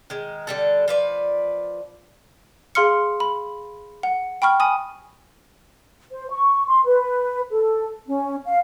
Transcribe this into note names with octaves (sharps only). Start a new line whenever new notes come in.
D#3 G#3
D3 G3 A4
F3 B4 D5
G#4 F5 C6 F6 C#7
B5
F#5
G5 B5 C#6 F6
G#5 B5 D#6
C5
C#6
C6
B4
A4
C#4
F5